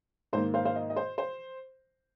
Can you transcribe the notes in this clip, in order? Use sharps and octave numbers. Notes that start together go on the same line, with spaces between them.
G#2 D#3 A#3 C5
C5 F5
C5 F5
D#5
D#5
C5
C5